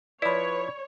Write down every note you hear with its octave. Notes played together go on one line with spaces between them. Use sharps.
F3 E4 B4 C#5 D5 B5